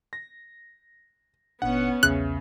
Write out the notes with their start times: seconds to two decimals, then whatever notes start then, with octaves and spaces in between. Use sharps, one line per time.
0.13 A#6
1.62 G1 A#2 B3 C#4 D4 F#5
2.03 B1 E2 C#3 E5 F#6